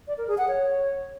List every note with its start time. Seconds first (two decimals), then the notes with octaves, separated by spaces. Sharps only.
0.08 D5
0.18 A#4
0.28 G#4
0.38 F#5
0.48 C#5